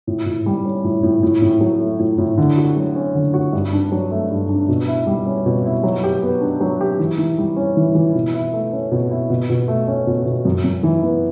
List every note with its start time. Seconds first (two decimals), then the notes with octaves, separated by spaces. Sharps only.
0.07 A2
0.26 A2
0.46 G3
0.65 C#4
0.84 A2
1.03 A2
1.23 A2
1.42 A2
1.61 F#3
1.81 A3
1.99 A2
2.18 A2
2.38 D3
2.57 F#4
2.77 F#3
2.96 C#4
3.15 D3
3.34 F#4
3.53 G2
3.73 D4
3.92 F#3
4.11 A3
4.30 G2
4.49 D4
4.68 B2
4.88 E4
5.07 G3
5.26 C#4
5.46 B2
5.65 E4
5.84 F#3
6.03 G4
6.23 B3
6.41 D4
6.61 F#3
6.81 G4
6.99 E3
7.18 E3
7.38 G3
7.56 C#4
7.77 E3
7.95 E3
8.15 B2
8.34 E4
8.53 A3
8.73 C#4
8.91 B2
9.11 E4
9.30 B2
9.50 B2
9.68 A3
9.88 C#4
10.07 B2
10.26 B2
10.45 F#2
10.64 F#2
10.83 E3
11.02 B3